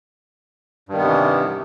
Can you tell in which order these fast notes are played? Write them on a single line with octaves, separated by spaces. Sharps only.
G2 D#3 B3 C3 E3